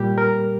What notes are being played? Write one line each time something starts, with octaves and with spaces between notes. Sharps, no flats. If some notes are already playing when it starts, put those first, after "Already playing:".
Already playing: A#2 G3 G4
A#4